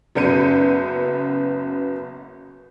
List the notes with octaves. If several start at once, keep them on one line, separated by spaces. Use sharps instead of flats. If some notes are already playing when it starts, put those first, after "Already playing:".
F#1 F#2 B3 G6 C#7 D#7